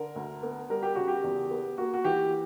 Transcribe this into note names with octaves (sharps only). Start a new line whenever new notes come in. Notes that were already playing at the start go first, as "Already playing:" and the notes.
Already playing: D3 A#4
D2
B3
G3 A#4
G4
C#3 F#4
G4
E2
B3
A#3 F#4
F#4
E3 G4